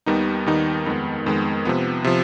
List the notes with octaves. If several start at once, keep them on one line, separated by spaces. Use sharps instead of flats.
D#2 D#3 G3 B3 D#4
D#2 D#3 G3 B3 D#4
F2 D#3 G#3 B3
F2 D#3 G#3 B3
C3 F3 B3
C3 F3